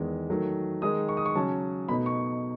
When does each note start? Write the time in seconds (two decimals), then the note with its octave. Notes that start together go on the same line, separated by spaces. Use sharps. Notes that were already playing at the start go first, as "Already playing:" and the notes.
Already playing: E2 D#3 G#3
0.30 D#3 F#3 A3
0.82 D#3 G#3 D#4 D#6
1.09 C#6
1.17 D#6
1.26 C#6
1.35 C#3 F#3 C#4 A5
1.88 B2 A3 D#4 B5
2.06 C#6